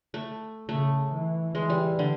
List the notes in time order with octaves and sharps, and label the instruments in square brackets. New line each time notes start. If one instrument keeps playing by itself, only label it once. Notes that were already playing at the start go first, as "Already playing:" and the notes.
[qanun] A3
[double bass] C#3 [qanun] A3
[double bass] E3
[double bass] E3 [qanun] G#3
[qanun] G3
D3